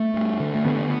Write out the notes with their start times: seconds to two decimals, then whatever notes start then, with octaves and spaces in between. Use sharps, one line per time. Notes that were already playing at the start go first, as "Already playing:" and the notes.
Already playing: A3
0.14 G2
0.40 D3
0.55 A3
0.65 D3 B3